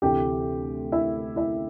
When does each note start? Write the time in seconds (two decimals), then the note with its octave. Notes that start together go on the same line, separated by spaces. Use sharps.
0.02 D2 C3 E3 A3 G4 G5
0.92 E4 E5
1.36 E4 E5